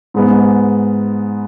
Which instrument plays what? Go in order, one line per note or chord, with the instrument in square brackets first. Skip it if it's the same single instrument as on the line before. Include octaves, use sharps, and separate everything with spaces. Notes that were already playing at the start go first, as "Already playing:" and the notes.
[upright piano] G#2 G#3 B3